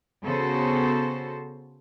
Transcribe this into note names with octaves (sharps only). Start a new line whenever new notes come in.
C#3 B3 F#4 A4 C5